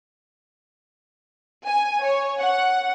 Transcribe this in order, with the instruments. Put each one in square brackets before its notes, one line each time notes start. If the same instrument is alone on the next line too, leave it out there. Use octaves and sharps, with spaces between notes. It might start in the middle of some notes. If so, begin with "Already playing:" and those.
[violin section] G#5
C#5
F#5